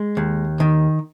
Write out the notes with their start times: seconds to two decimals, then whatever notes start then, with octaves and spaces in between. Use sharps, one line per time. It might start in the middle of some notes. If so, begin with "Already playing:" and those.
Already playing: G#3
0.17 D#2
0.60 D#3